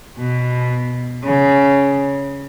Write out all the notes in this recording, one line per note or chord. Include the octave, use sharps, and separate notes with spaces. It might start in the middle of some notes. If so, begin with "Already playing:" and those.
B2
C#3